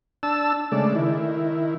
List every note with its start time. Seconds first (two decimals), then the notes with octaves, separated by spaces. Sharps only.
0.23 D4 A5 E6
0.72 C#3 G#3 A3 D5
0.95 D#3 E4